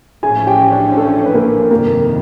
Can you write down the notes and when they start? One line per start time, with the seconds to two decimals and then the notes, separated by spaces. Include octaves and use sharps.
0.22 A1 A2 F3 A3 C#4 G#4 G#5
0.47 G4 G5
0.72 D4 D5
0.97 A4
1.26 B4
1.34 A#3 A#4
1.71 G1 F2 C3 D#3 A#3 A#4